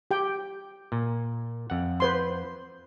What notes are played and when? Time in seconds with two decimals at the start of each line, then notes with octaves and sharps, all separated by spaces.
0.11 G4 G5
0.92 A#2
1.70 F2 F#5
2.00 B4 C5 C6